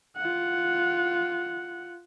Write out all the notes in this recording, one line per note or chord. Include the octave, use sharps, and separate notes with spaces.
F4 F#5